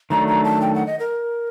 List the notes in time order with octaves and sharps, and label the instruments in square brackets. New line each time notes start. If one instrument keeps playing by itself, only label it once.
[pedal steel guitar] D#3 F#3 A3 D4 F#4 [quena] A#5
[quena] A#5
A5
G5
F#5
D#5
A#4